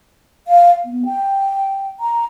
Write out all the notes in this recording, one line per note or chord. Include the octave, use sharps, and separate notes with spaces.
F5
B3
G5
A#5